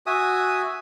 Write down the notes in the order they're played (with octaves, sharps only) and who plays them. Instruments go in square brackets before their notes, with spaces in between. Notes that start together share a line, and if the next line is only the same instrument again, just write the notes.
[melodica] F#4 E5 G#5 D#6